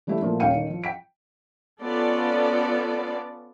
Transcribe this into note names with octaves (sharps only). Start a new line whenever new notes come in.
E3 G3 A3 E4 G4
A#2 F3 A3
D#1 C#4 F5 G5 C#7 D#7
D#3
F3
G5 B6 D7
B3 C#4 F4 A4 D5